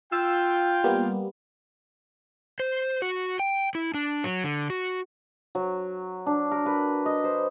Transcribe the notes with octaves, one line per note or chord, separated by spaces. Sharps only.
F4 G5 E6
G3 A#3 B3
C5
F#4
G5
E4
D4
F#3
D3
F#4
F#3
D4
A#4
B4
D#5
C5